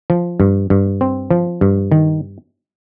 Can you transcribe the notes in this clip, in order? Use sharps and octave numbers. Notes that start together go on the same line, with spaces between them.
F3
G2
G2
C4
F3
G2
D#3